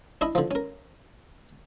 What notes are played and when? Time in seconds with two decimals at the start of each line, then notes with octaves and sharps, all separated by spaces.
0.21 D4 E4 D#5 B5
0.35 D3 F3
0.51 C#4 A#4